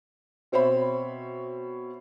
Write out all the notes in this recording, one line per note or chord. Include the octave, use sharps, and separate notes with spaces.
B2 C4 C5 C#5 E5 B5